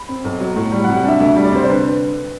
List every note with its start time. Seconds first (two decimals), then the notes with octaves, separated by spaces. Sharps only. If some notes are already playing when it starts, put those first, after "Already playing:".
Already playing: B5
0.09 C4
0.24 B1
0.40 F#3
0.56 A2
0.72 G3
0.84 F#5
0.88 C3
0.96 F#5
1.04 D4 E5
1.20 D2 E5
1.36 G3
1.44 D5
1.52 C3 C5
1.64 C5
1.68 D3 B4